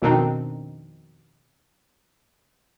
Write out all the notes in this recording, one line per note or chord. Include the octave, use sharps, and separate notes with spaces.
F2 B2 D#3 C4 D4 D#4